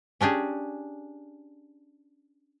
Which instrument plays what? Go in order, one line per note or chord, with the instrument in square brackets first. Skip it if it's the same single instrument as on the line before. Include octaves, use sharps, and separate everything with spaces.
[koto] C#4 D4 G4 G#4